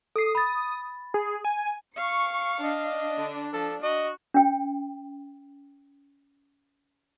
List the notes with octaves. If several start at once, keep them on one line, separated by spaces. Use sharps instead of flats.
A4 D#6 C7
B5 A6
G#4
G#5
F5 C#6 C#7
D4 D#5
D3
F3 A4
F#4 D#5
C#4 G5